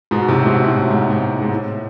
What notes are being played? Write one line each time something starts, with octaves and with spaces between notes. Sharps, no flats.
G#2 B2
A2 C3
G#2 B2
A2
A2
G#2
G#2
G#2
A2